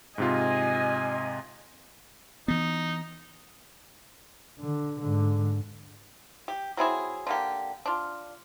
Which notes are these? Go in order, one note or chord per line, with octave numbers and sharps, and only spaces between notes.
G#2 C3 F4 D#5 G#5
E3 B3 D#4
D3
G#2 D3
G4
F#3 C4 E4 G#4
D3 A#3 G4
D4 F4